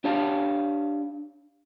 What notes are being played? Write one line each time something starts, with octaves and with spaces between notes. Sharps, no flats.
D4 G4 C#5 F5 A5